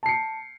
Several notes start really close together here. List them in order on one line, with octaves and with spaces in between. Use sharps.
A5 C7 C#7